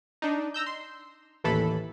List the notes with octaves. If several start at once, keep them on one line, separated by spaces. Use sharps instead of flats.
D4 D#4
A#5 E6 G6
C6
A1 D#2 A2 E3 A4 B5